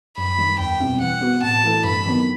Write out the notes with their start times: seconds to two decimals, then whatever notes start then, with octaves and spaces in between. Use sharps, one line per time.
0.17 F#2 B5
0.38 D#3 G3
0.59 E2 G5
0.80 B2 G3 C4 E4
1.01 E3 F#5
1.21 B3 F#4
1.43 A2 A5
1.64 E3 A3 E4 A4
1.84 G2 B5
2.05 D#3 F#3 B3